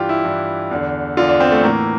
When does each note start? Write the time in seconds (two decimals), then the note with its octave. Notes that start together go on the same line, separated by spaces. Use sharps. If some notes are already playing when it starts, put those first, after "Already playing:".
Already playing: G2 E3 F4 G4
0.09 E4
0.24 G2 E3
0.71 E2 D3
1.17 E2 D3 F4
1.29 D4
1.40 C4
1.52 A3
1.63 A2 E3 A#3